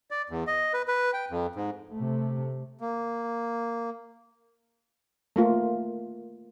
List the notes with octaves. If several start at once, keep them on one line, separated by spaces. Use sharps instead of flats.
D5
E2
D#5
B4
B4
G5
F2
G#2
C3 A3
A#3
A3 A#3 F4